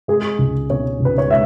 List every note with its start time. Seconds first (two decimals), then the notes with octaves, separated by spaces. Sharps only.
0.08 G#3 G#4
0.39 C#2
0.70 B2 C#5
1.00 C#2
1.05 B4
1.18 C#5
1.31 G#3 E5